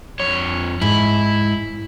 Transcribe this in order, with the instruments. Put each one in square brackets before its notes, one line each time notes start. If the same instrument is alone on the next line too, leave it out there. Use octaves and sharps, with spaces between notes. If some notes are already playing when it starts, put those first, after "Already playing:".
[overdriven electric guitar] F2 C#5
[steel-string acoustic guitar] G#2 [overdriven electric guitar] E4